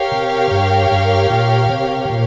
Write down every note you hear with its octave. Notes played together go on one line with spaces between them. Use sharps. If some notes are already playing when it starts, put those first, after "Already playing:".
Already playing: G4 A#4 C#5 F5
C3
G2
G2
A#2
C3
A#2